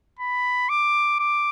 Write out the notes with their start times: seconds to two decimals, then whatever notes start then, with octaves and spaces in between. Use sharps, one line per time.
0.20 B5
0.69 D6
1.20 D6